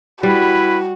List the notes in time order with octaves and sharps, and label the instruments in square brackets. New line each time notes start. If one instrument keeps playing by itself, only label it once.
[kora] G3 [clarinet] E4 [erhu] F#4 [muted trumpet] B4